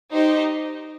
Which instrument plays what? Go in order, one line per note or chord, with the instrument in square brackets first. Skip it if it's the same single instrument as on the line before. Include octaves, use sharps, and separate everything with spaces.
[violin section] D#4 G4 C5 D#5